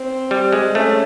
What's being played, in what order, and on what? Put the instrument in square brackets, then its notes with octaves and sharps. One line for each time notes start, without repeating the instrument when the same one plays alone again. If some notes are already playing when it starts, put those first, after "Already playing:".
Already playing: [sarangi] C4
[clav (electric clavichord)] G3
G#3
[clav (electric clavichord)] A3 [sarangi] C#4